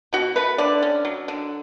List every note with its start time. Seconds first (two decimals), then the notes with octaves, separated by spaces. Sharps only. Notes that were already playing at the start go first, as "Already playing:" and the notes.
0.13 B2 F#4
0.36 A3 B4
0.58 D3 D5
0.82 C#4
1.05 F#3
1.28 D3